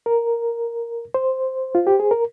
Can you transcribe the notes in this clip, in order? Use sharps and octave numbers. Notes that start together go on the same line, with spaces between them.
A#4
C5
F4
G4
G#4
A#4